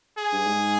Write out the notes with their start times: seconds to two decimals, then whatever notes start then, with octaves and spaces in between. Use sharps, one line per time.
0.18 G#4
0.32 G2
0.46 G#2